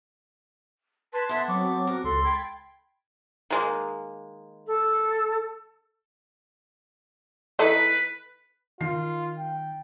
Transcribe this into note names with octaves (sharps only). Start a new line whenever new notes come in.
B4 A5 C6 F#6 G#6
B3 A4 E5
F#3 C4 C#6 D6
F#4 A#4
C#2 A4 C6
G5 B5 G#6 A6
D#3 G#3 A#3
A4
E3 D#4 A4 B4
D#3 F4 C7
G5